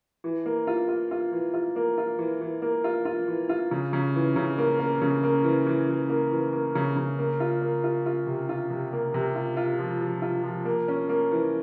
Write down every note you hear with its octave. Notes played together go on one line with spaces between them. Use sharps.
E3
A#3
F4
F4
F4
E3
F4
A#3
F4
E3
E3
A#3
F4
F4
E3
F4
C#3
C#3
E3
C#3
A#3
A#3
C#3
A#3
E3
E3
E3
A#3
E3
A#3
C#3
C#3
A#3
F4
A#3
F4
F4
C3
F4
C3
A#3
C3
F4
F4
F3
F3
F4
F3
A#3
C#4
A#3
E3